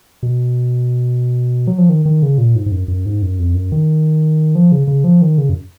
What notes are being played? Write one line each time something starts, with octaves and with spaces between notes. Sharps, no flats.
B2
F#3
F3
D#3
D#3
C#3
A#2
G#2
G#2
F#2
F#2
G#2
F#2
F2
F#2
D#3
F3
C#3
C#3
F3
D#3
C#3
F#2